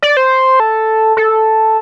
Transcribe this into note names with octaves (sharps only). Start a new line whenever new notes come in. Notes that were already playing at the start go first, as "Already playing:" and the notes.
D5
C5
A4
A4